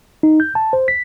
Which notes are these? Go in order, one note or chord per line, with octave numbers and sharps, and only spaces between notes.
D#4
G6
A5
C5
B6